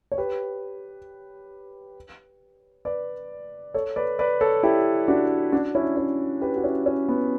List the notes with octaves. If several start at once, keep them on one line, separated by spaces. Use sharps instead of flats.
C#5
G4 B4
B4 D5
A4 C#5
B4 D5
B4 D5
A4 C#5
E4 G4
D4 F#4
D4 F#4
C#4 E4
C#4 E4
G4 B4
F#4
C#4 E4
C#4
B3